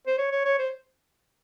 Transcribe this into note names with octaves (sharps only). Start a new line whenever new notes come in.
C5
C#5
C#5
C#5
C5